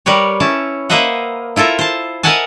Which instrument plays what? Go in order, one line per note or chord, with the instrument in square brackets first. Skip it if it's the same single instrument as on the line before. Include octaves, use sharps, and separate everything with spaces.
[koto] G3 A#4 B4 C#5
C#4 E4 C#5 A5
A#3 B4 C5 D#5 E5 F#5
E4 F4 A4 A#4 E5
C5 A5
A#4 D#5 E5 F#5 G#5 A5